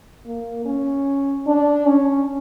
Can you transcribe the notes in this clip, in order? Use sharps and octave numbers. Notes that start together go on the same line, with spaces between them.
A#3
C#4
D4
C#4